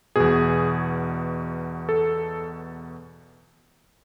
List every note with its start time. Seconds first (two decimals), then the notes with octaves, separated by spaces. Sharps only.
0.16 E2 B2 G#4
1.89 A4